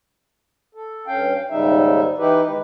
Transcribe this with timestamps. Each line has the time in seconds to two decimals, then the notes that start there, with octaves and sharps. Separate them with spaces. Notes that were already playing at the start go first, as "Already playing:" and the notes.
0.75 A4
1.07 G2 C#4 F5 G5
1.50 D#2 G#2 C#3 G3 D#4 E5
2.18 E3 D#4 E4 G4 B4
2.46 D#3 G#3 B4